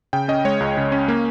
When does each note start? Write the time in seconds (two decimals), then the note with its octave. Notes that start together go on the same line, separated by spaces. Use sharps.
0.13 C#3 G5
0.28 C#4 D#5
0.45 G#3 C#5
0.60 C#2
0.77 C#3
0.92 C#4
1.08 A#3